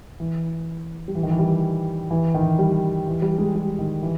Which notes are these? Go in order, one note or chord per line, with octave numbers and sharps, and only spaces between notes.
E3
G3
E3
D#3
E3
G3
E3
D#3
E3
G3
E3
G3
G#3
G3
D#3
E3